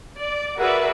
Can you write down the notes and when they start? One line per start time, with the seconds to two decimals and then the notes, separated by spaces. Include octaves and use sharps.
0.17 D5
0.58 F#4 G#4 A#4 B4 D5 E5